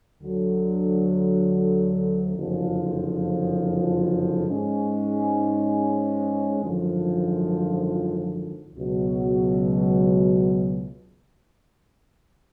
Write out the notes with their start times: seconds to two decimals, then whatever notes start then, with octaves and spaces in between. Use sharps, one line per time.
0.22 D2 D3 F#3
2.35 F#1 F2 D3 F3
4.48 G#2 G#3 C#4
6.61 G#1 F#2 D3 F3
8.74 C#2 B2 F#3